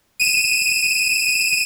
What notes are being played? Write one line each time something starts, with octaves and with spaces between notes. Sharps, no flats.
D#7 E7